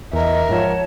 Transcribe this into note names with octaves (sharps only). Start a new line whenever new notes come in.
E2 A#4 D#5 E5
G#2 F3 C#5 F#5 A5